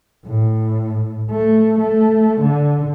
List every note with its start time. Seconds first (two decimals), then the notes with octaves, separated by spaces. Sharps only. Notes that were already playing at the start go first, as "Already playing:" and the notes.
0.26 A2
1.31 A3
1.80 A3
2.42 D3